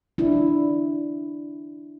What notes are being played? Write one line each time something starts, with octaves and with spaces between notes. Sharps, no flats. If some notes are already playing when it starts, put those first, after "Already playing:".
D4 E4